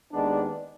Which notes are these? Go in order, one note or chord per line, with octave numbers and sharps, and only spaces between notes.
D#2 D#3 G#3 B3 D4